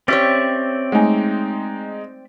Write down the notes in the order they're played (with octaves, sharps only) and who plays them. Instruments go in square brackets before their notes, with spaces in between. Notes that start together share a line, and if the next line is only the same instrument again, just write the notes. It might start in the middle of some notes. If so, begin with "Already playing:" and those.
[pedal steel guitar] C4 D5 E5 [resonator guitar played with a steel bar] C#4 G4 C#5
[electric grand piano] G#3 D#4 [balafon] A3 G#5